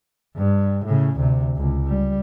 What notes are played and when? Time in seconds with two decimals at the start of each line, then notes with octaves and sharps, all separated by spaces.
0.36 G2
0.85 A2 C#3
1.16 D2 C3
1.56 C#2
1.87 G3